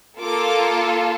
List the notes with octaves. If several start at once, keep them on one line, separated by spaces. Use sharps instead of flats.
A#3 F4 A4 D6